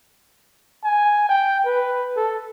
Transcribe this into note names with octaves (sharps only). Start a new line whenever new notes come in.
G#5
G5
B4
A4